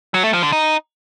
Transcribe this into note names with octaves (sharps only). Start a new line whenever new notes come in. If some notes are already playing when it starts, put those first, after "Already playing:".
F#3
A3
F3
D3
D#4